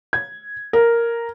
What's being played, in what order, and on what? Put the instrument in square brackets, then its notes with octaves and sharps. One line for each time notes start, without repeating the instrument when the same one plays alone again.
[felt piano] G#6
A#4